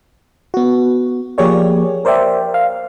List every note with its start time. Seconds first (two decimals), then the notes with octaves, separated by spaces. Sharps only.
0.54 B3 F#4
1.38 F3 A#3 G4 G#4 C#5 D5
2.05 A#4 C5 D5 E5 G5
2.54 F5